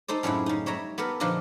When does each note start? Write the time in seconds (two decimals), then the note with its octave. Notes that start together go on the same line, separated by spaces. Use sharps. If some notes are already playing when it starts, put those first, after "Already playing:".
0.08 D#4 A4 C5 D5
0.23 F#2 A2 C#3 D4 E4
0.46 C#3 D#4
0.66 G3 C#5 E5 A#5
0.98 B3 G4 A4 A#4
1.20 A#2 D3 F3 D4 D#4 F4